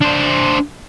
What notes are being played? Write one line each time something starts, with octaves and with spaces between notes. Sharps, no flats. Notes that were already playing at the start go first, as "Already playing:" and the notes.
D4 C5